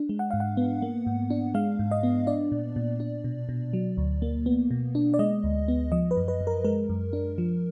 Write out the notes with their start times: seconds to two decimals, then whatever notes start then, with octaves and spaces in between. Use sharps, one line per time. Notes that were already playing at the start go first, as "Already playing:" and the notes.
Already playing: D4
0.09 G#3
0.19 F#5
0.31 G#2 F5
0.40 F#5
0.57 B3
0.82 A#3
1.07 G#2
1.30 D4
1.54 G#3 F5
1.79 G#2
1.91 D#5
2.03 B3
2.27 D4 D5
2.52 A#2
2.76 A#2
3.00 D4
3.24 B2
3.49 B2
3.73 F#3
3.97 D2
4.22 A#3
4.46 B3
4.71 B2
4.95 D4
5.14 D5
5.19 G#3 D#5
5.44 D2
5.68 B3
5.92 F3 D#5
6.11 B4
6.17 F#2
6.28 B4
6.41 F#2
6.47 A#4
6.64 G#3 A#4
6.89 F#2
7.13 D4
7.38 F3